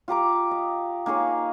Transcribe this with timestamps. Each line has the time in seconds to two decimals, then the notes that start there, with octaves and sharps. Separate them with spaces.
0.08 F4 G4 A#5 D6
0.51 D#5
1.06 A#3 D#4 G#4 C#5